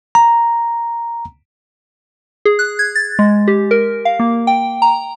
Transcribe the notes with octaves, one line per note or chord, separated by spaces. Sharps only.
A#5
G#4
F#6
G#6
A6
G#3
G4
A#4
F5
A#3
G5
A#5